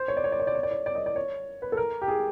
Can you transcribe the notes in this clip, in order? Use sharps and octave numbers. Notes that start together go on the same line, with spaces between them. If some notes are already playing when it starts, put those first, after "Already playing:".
Already playing: C5
C#5
D5
C#5
D5
C#5
D5
C#5
D5
C#5
D5
D#5
D5
C#5
B4
A4
A#4
G4
G#4